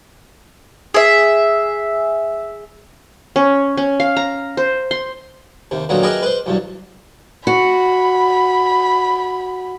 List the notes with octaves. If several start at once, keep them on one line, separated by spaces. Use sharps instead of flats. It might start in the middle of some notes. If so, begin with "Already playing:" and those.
G#4 E5
C#4
C#4
F5
A#5
C5
C6
D#2 C3
A#2 D3 D#3 F#3 A#3 B3
G4 G#4 A#4 B4 D#5 E5
B4 C5
B1 E2 G2
F#4 B5